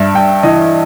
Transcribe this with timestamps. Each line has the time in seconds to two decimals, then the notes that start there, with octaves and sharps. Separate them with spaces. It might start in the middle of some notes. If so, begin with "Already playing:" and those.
Already playing: G2 E5
0.14 G2 G5
0.43 E3 D#5